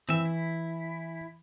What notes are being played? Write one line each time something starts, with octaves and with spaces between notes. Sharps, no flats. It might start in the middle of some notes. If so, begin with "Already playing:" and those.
E3 C4 E5
E4